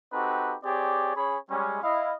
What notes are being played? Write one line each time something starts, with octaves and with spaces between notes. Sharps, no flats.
C4 D#4 F#4 G4 A4 B4
C4 G4 G#4 C#5 D5
C#4 G#4 C#5 B5
G3 G#3 C#4
E4 D#5 F5